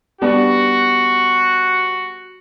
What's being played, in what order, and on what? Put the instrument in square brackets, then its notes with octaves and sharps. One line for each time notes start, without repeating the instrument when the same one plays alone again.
[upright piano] G3 B3 D4 [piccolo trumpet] F#4